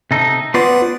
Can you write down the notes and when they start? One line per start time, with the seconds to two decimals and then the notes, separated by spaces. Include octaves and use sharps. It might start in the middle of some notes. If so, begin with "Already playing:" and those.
0.11 C3 D#4 A4
0.54 B3 F4 B4 C5 D5 F#5